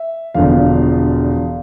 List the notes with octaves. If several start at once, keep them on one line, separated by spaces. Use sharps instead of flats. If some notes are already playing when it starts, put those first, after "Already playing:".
Already playing: E5
E1 E2 D3 F3 F5